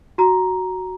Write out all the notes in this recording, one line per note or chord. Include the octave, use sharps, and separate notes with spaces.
F#4 A#5